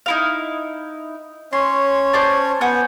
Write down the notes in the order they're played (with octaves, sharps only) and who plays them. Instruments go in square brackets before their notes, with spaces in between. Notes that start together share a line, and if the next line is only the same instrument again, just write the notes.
[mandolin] D#4 E4 F5
[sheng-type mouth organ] C#4 C#5 [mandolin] C6
[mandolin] C5 D5 A5
[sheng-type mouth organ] B3 [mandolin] F#5 G#5 G6